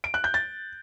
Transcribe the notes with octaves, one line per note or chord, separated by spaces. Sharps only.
D7
F#6
G6
A6